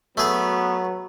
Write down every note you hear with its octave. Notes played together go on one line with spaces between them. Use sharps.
F#3 A3 B3 G#4